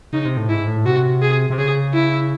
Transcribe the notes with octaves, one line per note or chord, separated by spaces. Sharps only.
C#3 D#4
C3
A2
G#2 E4
A2
C3 F#4
G#4
C3
C#3 G#4
E4